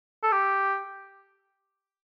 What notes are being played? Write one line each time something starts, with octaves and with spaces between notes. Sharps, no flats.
A4
G4